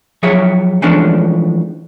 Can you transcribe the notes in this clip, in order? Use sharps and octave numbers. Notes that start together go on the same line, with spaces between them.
F3 F#3 G#4 C#5 E5
E3 F3 G#3 A3 C#4 D4